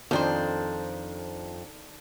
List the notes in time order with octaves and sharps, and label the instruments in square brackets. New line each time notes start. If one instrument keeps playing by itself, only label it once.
[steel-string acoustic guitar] F2 [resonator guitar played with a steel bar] D#3 D4 C5